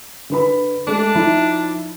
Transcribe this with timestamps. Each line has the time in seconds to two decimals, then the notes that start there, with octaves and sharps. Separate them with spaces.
0.30 D3 B4 B5
0.87 G#3 A3 D4
1.15 F3 D#4 E4